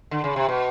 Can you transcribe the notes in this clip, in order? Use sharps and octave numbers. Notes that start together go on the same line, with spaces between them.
D3
C#3
C3
B2